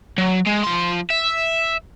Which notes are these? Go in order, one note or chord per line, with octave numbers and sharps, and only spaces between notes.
F#3
G#3
F3 C6
E5